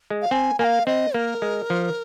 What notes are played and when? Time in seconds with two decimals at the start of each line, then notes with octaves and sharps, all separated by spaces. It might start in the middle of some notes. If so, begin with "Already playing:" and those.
0.10 G#3
0.22 F5
0.31 C4 G#5
0.59 A#3 G#5
0.64 F5
0.86 C4 D#5
1.14 A#3 A#4
1.42 G#3
1.70 F3